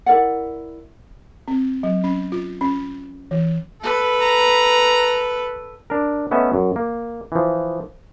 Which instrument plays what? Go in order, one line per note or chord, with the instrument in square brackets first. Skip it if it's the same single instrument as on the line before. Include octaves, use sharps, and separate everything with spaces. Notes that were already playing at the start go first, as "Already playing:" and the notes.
[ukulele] E4 A#4 D5 F#5
[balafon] C4
F#3
C#4
F4
C#4
E3
[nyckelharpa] A4 B4
[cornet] A#5
[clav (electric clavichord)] D4 A#4
A3 B3 C#4 D#5 E5
F#2
A#3
E3 F3